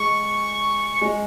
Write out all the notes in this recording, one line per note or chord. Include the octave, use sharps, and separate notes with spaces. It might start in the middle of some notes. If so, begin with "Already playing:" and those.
Already playing: G#3 C#6
G#3